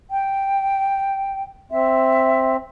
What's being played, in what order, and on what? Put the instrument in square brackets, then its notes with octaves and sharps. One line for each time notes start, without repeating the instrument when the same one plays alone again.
[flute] G5
[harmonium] C4 [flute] E5